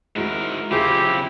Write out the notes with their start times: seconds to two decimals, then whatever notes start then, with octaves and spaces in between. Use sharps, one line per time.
0.16 G#2 G#3 E4 F#4 A#4
0.71 C#3 C4 E4 F4 G4 G#4